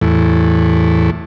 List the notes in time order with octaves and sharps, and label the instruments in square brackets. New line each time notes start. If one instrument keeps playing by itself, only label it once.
[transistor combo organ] E2 A2